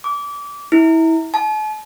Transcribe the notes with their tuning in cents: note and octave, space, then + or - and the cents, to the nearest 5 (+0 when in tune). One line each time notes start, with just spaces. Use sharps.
D6 -25
E4 -25
A5 -45